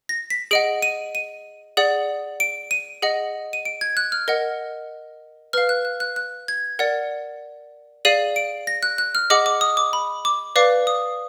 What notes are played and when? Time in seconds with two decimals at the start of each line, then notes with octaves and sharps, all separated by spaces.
0.09 A#6
0.30 B6
0.51 G#4 D#5 F#5 D7
0.82 D#7
1.15 D#7
1.77 G#4 D5 F#5
2.40 D7
2.71 D#7
3.02 G#4 D#5 F#5
3.53 D#7
3.65 D7
3.81 G#6
3.97 F#6
4.12 F6
4.28 A#4 D#5 F#5
5.53 B4 F5 F6
5.69 F#6
5.85 F#6
6.00 F#6
6.16 F#6
6.48 G#6
6.79 A#4 D5 F#5
8.05 G#4 D5 F5 D#7
8.36 D7
8.67 A#6
8.83 F#6
8.98 F#6
9.15 F6
9.30 G#4 D#5 F#5 D6
9.46 D6
9.61 D#6
9.77 D6
9.93 B5
10.25 D6
10.56 B4 D5 F5 D6
10.87 D#6